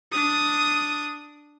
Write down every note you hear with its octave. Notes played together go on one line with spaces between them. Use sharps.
D4 D#6